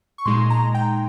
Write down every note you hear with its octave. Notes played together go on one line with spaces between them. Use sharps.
C#6
A#2 G#3 D#4 C6
A#5
G5